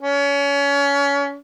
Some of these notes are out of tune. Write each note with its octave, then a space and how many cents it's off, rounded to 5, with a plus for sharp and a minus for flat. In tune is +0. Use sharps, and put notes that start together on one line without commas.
C#4 +30